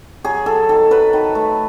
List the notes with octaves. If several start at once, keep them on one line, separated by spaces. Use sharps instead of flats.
F#3 G#4
F#3 A4
D#3 A4
F#3 B4
D#3
A3